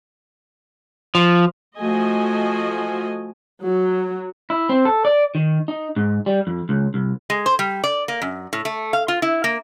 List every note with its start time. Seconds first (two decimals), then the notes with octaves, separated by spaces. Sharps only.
1.15 F3
1.79 F3 A3 F#4 D#5 G#5
3.63 F#3
4.50 E4
4.69 C4
4.85 A4
5.05 D5
5.35 D#3
5.68 D#4
5.96 G#2
6.26 G3
6.47 F2
6.69 C#2
6.94 C2
7.30 G#3
7.46 C5
7.59 G3
7.84 D5
8.08 A#3
8.22 F#2
8.53 A2
8.65 A3
8.93 F5
9.08 F4
9.22 E4
9.44 A#3